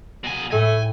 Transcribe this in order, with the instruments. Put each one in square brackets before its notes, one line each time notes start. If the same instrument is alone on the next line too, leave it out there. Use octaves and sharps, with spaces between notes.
[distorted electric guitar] B2 G#5
[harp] A2 [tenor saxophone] A3 [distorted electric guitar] G#5